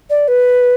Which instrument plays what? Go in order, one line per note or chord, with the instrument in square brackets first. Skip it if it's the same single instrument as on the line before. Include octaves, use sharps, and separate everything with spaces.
[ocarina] D5
B4